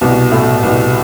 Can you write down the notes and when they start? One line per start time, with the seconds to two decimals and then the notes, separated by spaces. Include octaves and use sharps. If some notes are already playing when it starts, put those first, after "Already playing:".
0.01 C2 B2
0.31 A2 A3
0.63 C2 B2